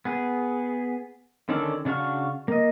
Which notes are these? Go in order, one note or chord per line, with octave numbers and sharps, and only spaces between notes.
B3 G#4
D3 D#3 C#4 A4 D5
C#3 D4 F#4 F5 C#6
A#3 D#5